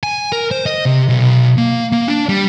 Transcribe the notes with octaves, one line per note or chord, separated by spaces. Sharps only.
G#5
A#4
C5
D#5
C3
B1
A#3
A#3
D4
G3